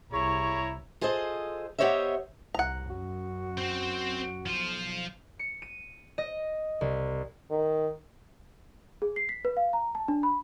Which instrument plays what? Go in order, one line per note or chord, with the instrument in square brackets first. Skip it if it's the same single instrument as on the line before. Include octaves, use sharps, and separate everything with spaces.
[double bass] C2 [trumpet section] E4 C#5 A#5 [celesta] G#4 C#6 F7
[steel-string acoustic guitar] F4 G#4 A4 C5 D#5
B3 G4 C5 C#5 D#5 E5
[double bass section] C2 [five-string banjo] F#5 A#5
[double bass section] F#2 [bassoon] F#4
[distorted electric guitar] C4 C5
[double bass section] B1 [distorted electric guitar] F3 F4
[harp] C#7
D#7
D#5
C2
[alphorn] D#3
[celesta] G#4
C7
B6
B4
F5
A#5
A5
D4
B5